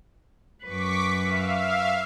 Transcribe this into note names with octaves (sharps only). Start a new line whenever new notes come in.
F#2 B4 C#6 D6 B6
E5 F5